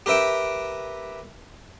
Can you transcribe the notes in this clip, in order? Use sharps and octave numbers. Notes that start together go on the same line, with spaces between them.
G4 A#4 B4 E5 G5